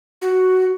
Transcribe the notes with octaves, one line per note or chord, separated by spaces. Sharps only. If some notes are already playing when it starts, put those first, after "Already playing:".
F#4